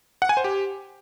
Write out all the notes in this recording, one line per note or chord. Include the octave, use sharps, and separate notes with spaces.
F#5
G#5
C5
G4